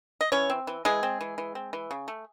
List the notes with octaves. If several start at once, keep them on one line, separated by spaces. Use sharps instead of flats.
D#5
E3 C#4 C#5
C4
E3
E3 G#3 G#4
C4
E3
E3
C4
E3
C#3
A3